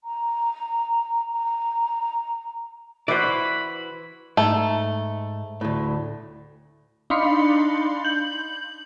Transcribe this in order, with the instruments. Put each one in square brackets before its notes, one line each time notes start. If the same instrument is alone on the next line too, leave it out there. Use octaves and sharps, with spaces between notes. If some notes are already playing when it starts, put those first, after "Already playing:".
[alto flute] A#5
A#5
[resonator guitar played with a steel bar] E3 F#4 [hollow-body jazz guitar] C5 D5 [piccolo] B5
[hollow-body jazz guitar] G#2 [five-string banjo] A3
[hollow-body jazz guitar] D2 A2
[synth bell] D4 D#4 F5 B5 C6 C#7
G6 F#7